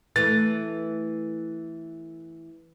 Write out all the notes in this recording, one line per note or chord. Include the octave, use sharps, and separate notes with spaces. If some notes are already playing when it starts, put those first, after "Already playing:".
E3 A3 A6